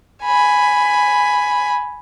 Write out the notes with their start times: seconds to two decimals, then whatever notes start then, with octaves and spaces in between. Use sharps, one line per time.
0.24 G#5 B5